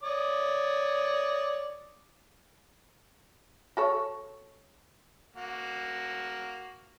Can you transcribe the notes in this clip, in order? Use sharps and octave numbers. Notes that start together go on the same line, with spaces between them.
C#5 D5 D#6
F#4 A4 C#5
A#3 F#4